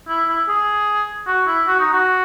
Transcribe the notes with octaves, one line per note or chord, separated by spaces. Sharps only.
E4
E4
G#4
F#4
E4
F#4
D#4
F#4